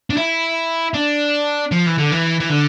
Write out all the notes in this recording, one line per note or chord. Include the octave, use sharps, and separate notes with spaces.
D4
E4
D4
F3
E3
D3
E3
E3
D3